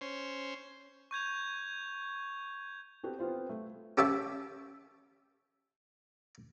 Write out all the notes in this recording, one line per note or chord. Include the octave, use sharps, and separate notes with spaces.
C#4 C5
C#6 G6 G#6 F7
B3 C4 F#4 G4 A4
B3 C4 F4 C5
A3
C#4 G4 A4 E5 A5